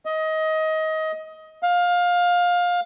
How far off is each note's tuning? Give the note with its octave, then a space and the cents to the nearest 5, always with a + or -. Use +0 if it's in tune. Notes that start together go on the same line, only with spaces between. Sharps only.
D#5 +20
F5 +20